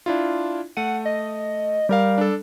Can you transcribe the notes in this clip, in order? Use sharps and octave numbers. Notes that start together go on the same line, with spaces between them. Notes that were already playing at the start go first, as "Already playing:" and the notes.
D4 E4 F4
A3 F#5 D#7
D#5
G3 G4 A#4 F5
D4 A4